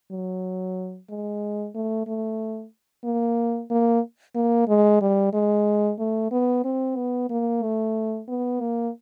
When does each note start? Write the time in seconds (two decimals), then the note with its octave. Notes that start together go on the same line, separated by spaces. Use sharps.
0.11 F#3
1.10 G#3
1.75 A3
2.07 A3
3.04 A#3
3.70 A#3
4.35 A#3
4.68 G#3
5.01 G3
5.33 G#3
5.99 A3
6.31 B3
6.65 C4
6.96 B3
7.30 A#3
7.63 A3
8.28 B3
8.60 A#3